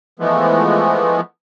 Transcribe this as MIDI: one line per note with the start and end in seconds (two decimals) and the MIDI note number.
0.20 1.21 52
0.20 1.21 53
0.20 1.21 56
0.20 1.21 57
0.20 1.21 59